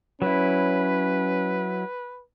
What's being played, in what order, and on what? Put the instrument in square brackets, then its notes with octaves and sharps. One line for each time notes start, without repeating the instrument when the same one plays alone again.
[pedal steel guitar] F#3 E4 [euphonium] C#4 [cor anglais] B4